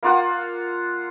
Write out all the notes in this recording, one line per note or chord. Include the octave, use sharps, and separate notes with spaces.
A#3 F4 F#5